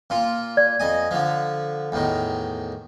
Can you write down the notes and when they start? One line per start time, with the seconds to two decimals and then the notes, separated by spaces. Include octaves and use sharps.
0.10 A#2 F4
0.57 D5 G#6
0.80 F2 D#5 G#5
1.11 D3 F3
1.92 E2 A2 D#3